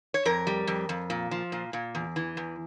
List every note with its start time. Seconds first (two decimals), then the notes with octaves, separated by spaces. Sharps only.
0.14 C#5
0.25 F2 A#4
0.47 G3
0.67 F2
0.89 F2
1.10 A#2
1.31 F3
1.52 A#2
1.73 A#2
1.95 E2
2.16 E3
2.37 E2